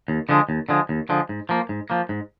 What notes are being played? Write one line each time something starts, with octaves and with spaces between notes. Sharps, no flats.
D#2
D3 F3 G#3
D#2
D3 F3 G#3
D#2
D3 F3 G#3
G#2
F3 A#3
G#2
F3 A#3
G#2